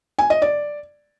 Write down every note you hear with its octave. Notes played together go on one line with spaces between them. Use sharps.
G#5
D#5
D5